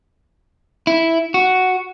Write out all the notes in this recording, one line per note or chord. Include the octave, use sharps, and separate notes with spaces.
E4
F#4